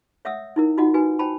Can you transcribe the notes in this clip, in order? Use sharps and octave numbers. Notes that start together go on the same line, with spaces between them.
C#5 E5 F#5 D#6 E6
D#4 E4 A#4
D#4 F4 F#4 D#5 F#5
D#4 F#4 B4 G#5
C5 G5 A5 B5